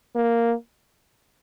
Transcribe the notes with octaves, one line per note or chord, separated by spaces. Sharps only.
A#3